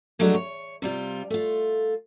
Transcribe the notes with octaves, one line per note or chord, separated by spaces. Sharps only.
F3 F#3 G#3 A3 D4 F#4
C#5
C3 G3 F4
A3 F4